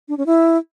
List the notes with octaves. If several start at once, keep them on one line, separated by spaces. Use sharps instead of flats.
D4
C#4
E4